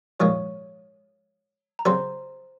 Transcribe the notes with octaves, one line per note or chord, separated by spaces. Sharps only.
A#1 G#2 D#3 G#3 C#5 C#6
A#5
C#3 F#3 C4 F#4 C5 C6